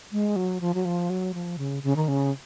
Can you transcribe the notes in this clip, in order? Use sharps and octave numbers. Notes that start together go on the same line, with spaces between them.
G#3
F#3
F3
F#3
F3
F#3
F3
C#3
C#3
D#3
C#3